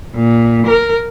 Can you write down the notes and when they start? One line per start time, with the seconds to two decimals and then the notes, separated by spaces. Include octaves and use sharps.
0.15 A#2
0.67 A#4